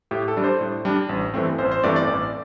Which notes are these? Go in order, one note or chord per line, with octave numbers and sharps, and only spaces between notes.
A2 G4
A4
G3 D4
C5
A2
G3 D4
A1
G2 E3 A3 C4
A1 C5
C5
G2 E3 A3 C4 D5
D5
A1 D5